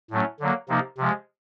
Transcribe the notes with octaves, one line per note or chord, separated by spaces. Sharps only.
A2 F#3 A3 C#4
D3 F#3 A#3
C3 F3 A#3 D#4
C3 F3 G#3